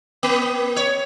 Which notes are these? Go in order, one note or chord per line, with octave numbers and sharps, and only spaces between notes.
A#3
C#5